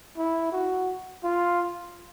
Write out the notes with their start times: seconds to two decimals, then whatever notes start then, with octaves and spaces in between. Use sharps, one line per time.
0.18 E4
0.52 F#4
1.24 F4